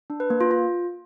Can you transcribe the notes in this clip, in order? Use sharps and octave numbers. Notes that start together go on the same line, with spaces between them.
D4
B4
A#3
F4
F4